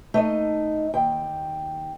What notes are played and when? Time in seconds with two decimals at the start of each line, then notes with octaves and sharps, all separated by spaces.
0.14 A3 D#4 D#5
0.94 D#2 G5